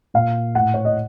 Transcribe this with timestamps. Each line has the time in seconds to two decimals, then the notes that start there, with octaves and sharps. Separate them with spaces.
0.14 A#2 F5
0.55 A2 F#5
0.74 C#5
0.85 D#5